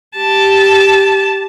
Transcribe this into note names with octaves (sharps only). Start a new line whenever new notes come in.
G4 A5